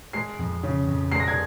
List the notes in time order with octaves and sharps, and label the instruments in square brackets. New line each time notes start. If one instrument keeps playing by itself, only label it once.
[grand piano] G#3 [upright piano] C7
[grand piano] F2
C#3
F2
[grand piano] G#3 [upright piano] C7
[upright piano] A#6
G#6